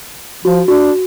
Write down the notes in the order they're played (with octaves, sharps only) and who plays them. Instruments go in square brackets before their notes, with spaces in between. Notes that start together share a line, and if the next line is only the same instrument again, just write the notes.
[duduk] F3 [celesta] F#4
[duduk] D4 [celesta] F#4